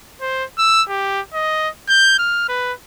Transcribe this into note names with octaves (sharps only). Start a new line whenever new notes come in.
C5
E6
G4
D#5
G6
F6
B4